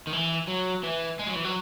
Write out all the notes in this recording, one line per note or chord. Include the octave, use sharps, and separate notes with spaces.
D#3
E3
F#3
E3
G#3
F#3
E3
F#3